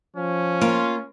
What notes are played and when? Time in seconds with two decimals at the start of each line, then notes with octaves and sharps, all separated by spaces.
0.16 F3 C#4
0.61 A#3 F4